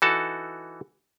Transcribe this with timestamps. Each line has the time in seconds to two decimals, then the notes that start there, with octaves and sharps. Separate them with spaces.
0.02 E3 D#4 F#4 A4 A5